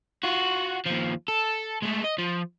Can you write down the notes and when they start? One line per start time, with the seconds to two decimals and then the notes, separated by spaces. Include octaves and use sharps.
0.24 F4 F#4
0.86 D#2 F3
1.28 A4
1.83 G#3 A3
2.05 D#5
2.19 F3